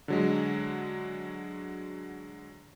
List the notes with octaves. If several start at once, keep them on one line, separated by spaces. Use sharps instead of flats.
D3 F#3 G#3